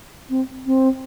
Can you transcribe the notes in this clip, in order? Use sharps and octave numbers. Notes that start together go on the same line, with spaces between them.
C4
C4